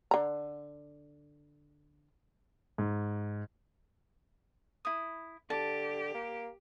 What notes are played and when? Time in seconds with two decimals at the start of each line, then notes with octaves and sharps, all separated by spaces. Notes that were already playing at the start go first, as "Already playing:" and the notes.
0.11 D3 A#5
2.78 G#2
4.85 E4 D#6
5.50 D3 G4 A5
6.14 A#3